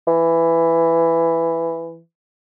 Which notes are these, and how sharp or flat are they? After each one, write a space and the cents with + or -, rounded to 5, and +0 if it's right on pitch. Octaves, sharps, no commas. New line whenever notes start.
E3 +10